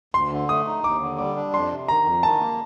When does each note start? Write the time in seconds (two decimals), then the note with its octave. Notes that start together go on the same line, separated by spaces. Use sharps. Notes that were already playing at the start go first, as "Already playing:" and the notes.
0.14 D2 C6
0.32 D3
0.49 A3 D#6
0.67 D#4
0.84 D#2 D6
1.02 D3
1.18 G3 D6
1.36 D4
1.54 F2 C6
1.71 C3
1.88 D#3 A#5
2.06 F2
2.23 D#3 A5
2.40 A#3